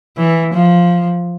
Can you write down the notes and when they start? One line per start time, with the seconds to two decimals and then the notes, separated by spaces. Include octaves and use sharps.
0.17 E3
0.54 F3